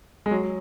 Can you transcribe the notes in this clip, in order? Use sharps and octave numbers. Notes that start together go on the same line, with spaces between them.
G#3
F#3